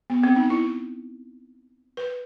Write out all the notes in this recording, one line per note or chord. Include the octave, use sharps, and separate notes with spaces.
B3
C4
D#4
E4
B4